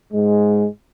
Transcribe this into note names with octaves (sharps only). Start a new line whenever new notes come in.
G#2 G#3